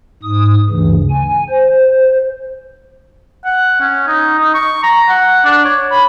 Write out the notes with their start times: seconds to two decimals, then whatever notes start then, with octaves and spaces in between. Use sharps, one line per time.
0.23 G#2 D#6
0.69 D2 G2 C#3 E3
1.10 G#5
1.49 C5
3.45 F#5
3.80 C#4
4.07 D#4
4.38 D#4
4.54 C#6
4.83 A#5
5.09 F#5
5.44 D4
5.65 C#5
5.91 B5